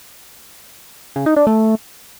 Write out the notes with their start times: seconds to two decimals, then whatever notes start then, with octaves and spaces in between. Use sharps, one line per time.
1.16 C#3
1.26 D#4
1.36 D4
1.47 A3